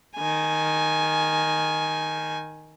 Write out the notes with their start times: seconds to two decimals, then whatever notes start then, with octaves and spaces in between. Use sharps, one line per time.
0.16 D#3 G#5